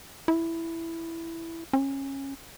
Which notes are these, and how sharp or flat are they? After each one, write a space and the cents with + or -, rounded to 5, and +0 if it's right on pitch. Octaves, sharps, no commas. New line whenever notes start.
E4 +5
C#4 -20